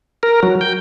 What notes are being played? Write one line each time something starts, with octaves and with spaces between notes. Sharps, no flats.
A#4
F#3
G5